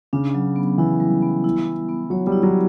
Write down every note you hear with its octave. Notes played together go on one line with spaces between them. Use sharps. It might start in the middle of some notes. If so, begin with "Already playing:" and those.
C#3 D4
F#3
B3
E3 E4
G3
B3
E4
G3
B3
F#3 C#5
G3
E4
F#3